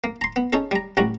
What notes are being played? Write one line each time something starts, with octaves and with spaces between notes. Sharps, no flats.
A#3
A#5 C6
B3
C#4 D#4 G#4 A4
G3 A#5
A1 G3 F#4 A#5